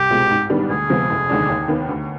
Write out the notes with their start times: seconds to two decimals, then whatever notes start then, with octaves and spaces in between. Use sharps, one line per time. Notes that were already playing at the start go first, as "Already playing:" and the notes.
Already playing: C2 G4
0.10 B2 G#3 C4 F4
0.30 G#2
0.50 D#3 G3 B3 D4
0.70 D2 G#4
0.90 C3 F3 G#3 B3
1.10 F1
1.29 D#2 D3 G#3 D4
1.49 D#2
1.68 D#3 B3
1.89 D2